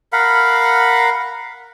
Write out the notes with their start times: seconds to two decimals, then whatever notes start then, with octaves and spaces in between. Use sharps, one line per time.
0.13 A#4 F5 F#5 B5